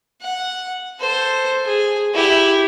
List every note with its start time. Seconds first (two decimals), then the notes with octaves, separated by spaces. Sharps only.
0.22 F#5
1.00 A4 C5
1.65 G#4
2.14 E4 G4